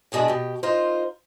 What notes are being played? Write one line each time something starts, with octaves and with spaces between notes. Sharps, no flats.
G2 B2 G#3 D4 E5
B2 G4
D#4 F4 A#4 C5